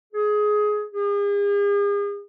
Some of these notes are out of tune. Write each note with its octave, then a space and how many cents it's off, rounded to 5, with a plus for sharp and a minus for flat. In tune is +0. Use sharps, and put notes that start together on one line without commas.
G#4 +15
G#4 -40